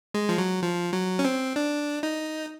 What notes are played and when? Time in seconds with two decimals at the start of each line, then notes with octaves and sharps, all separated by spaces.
0.14 G#3
0.29 F3
0.38 F#3
0.62 F3
0.93 F#3
1.19 C#4
1.25 C4
1.56 D4
2.03 D#4